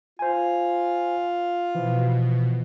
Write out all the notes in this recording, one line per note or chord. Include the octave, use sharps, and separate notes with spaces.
F4 C5 G#5
B2 E3 F3